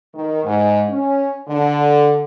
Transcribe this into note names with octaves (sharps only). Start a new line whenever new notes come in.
D#3
G#2
C#4
D3